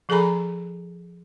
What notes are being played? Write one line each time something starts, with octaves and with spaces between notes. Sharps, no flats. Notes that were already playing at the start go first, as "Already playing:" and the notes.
F3 G#4 A4 G#5 A#5 B5